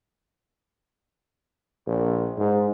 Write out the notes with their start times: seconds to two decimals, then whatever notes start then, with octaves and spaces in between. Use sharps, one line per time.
1.86 A#1
2.37 G#2